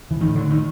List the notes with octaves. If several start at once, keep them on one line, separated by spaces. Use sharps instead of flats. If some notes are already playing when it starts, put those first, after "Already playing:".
E3
A2 D#3
D3
D#3